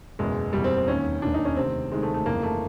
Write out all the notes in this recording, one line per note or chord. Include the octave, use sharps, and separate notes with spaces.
F#1 E2 B2 G#3
F#1 E2 B2 G3
C4
C4
E1 D#2 D#3 C#4
E1 D#2 D#3 D4
D#4
C#4
D2 C3 D#3 C4
D2 C3 D#3 G#3
A3
A3
G1 F2 C#3 E3 A#3
A3